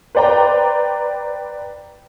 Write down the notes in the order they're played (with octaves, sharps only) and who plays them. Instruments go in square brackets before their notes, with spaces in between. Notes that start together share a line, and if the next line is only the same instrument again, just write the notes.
[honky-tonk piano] B4 C5 D5 G5 A#5